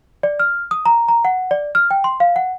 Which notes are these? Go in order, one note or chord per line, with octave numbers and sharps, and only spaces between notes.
D5
F6
D#6
A#5
A#5
F#5
D5
F6
G5
C6
F5
F#5